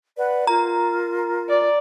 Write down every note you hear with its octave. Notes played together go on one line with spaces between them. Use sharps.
B4 D5 F#5
F4 A#4 A#5
D5